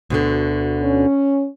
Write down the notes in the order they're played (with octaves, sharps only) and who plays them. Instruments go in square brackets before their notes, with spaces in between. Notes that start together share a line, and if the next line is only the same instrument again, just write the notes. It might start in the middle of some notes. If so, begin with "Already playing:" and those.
[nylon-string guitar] D2 B2 D3
[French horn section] C#4